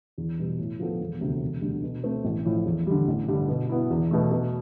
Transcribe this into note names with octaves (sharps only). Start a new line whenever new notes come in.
E2
B2 G3
A2
F3 B3 F4 A4
E1
D2 C3
E1
D2 D3 G3
B2
A3 C4
A1
A2 F3
E2
D3 G3
A1
G2 D3 G3
B2
B3 E4
E2
B2 A3
B2